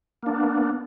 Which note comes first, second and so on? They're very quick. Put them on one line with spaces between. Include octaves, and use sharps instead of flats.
A#3 D4 B3